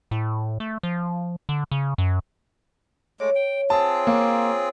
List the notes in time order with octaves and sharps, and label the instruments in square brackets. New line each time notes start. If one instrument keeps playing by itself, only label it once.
[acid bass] A2
A3
F3
D3
C#3
F#2
[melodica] G#3 A3 D6 [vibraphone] C#5
[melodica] G5
[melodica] C4 F4 G#4 [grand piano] A5
[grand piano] A#3